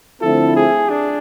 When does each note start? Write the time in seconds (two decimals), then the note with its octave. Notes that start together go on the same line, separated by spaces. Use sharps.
0.22 D3 F3 A3 C4 E4 A4
0.56 G#4
0.90 D4